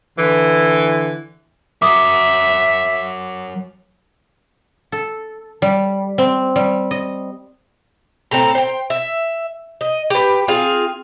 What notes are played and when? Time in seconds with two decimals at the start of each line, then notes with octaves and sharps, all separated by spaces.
0.18 D3 E3
1.82 F#3 A#4 E5 D6 D#6
4.92 A4
5.62 G3
6.18 C4
6.56 G3
6.91 D#5
8.31 A2 C4 A4 A#5
8.55 C5 G5
8.90 E5
9.81 D#5
10.10 G4 B4
10.48 C4 F4 G#4 F5